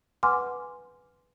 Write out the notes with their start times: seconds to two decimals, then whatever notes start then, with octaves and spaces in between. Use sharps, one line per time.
0.23 B4 F#5 G#5 C6 D6 F6